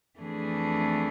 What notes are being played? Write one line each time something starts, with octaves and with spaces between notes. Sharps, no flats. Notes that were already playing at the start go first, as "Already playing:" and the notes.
F2 E3 A3 D4 G#4